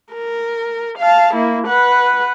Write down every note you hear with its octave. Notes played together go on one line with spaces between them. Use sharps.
A#4
F5 A5
A#3 E4
B4 F#5